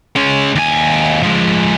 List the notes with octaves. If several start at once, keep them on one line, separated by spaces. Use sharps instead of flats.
G#3 C#4
D#2 G#5
F3 G#3